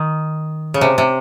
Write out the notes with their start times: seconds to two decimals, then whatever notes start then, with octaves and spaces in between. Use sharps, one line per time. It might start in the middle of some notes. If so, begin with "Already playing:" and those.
Already playing: D#3
0.74 C#3
0.81 C3
0.98 C3